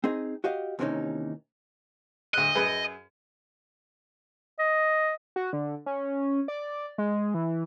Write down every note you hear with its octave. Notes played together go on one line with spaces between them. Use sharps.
C4 D#4 G#4 D#5
F#4 G4 D#5 F5
D#2 C3 E3 B3 C#4 D#4
D2 D#5 F#6
F#2 G#4 B4
D#5
F#4
D3
C#4
D5
G#3
E3